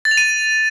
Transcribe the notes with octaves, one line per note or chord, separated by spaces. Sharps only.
A6
F7
D#7